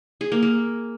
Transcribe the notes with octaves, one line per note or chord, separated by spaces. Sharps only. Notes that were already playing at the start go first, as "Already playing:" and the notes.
G#4
A#3
A#3